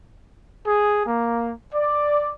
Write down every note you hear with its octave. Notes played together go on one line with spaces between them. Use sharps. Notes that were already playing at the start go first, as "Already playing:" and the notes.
G#4
A#3
D5